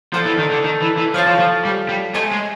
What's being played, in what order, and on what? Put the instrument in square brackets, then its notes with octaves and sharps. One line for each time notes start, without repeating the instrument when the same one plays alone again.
[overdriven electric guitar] F3 [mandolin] F#4 A4 D5
[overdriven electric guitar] E3
D#3
D3
D#3
E3
E3
[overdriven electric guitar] F3 [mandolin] F4 A4 C#5 F5
[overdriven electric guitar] F3
F3
G3
G3
[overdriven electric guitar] A3 [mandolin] G#4 C5 D#5 G#5
[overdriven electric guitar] G#3